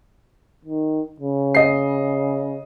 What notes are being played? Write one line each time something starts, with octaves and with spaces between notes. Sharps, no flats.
D#3
C#3
D#5 C7